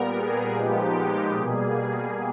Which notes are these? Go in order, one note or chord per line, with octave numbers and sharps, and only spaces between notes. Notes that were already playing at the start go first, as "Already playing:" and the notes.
Already playing: A#2 G3 B3 A#4
G#4
A#2 F3 G#3 B3 D#4 G4
B2 G3 A#3 G#4